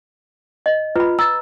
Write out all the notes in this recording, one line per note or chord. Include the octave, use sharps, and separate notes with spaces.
D#5
F4 B4 B5
A#5 E6 A6